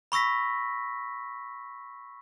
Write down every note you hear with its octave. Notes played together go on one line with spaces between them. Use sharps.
B5 C#6 E6 A#6 B6